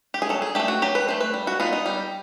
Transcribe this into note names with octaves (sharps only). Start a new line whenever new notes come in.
G4
G#4
F#3 A4
G#4
A3 D4 G4
F#4
F#3 G4
B4
A3 D4 C5
B4
G3
F#4
B3 D#4 F4
D#4
G3